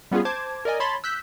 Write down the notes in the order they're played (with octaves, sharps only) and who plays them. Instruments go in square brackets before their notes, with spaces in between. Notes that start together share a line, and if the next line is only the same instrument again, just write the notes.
[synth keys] G3 B3 C#4 F4 G#4
C5 A5 D6 G#6
A#4 D5 D#5 G#5
C#5 A5 B5 C6 A6 B6
E6 F#6 G6 B6